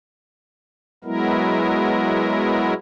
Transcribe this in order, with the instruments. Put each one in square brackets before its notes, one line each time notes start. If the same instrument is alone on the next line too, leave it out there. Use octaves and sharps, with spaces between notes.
[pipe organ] F#3 G#3 B3 E4 A#4